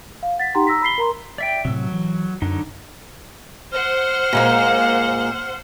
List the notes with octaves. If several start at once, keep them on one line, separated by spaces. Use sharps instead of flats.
F5
F#5 A6 B6
D#4 G4 F#5 G5 A#5 C6
A#5 E6 A#6 B6
B5 B6 C7 G7
A#4 A#5 C6
D5 E5 G5
A2 C3 F#3 E6
E3
F#2 D3 F#3 D#4
C5 F#5 F6
A#2 G#3 A#3